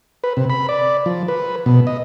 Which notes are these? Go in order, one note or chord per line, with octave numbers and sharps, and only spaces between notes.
B4
C3
B5
D5
F3
B4
B2
D#5